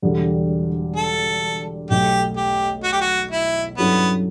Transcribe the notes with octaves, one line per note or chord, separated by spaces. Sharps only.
E1 E2 D3 G3
A4
B1 B2 A3 G4
G4
F#4
G4
F#4
E4
G2 F#3 B3 C#4 E4 A4